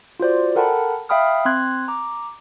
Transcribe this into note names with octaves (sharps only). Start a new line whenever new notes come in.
F4 F#4 C5 D5
A4 A#4 F#5 G5 A5 B5
E5 F5 G5 B5 D#6 F6
C4 C6 F#6 G#6
A#5 D6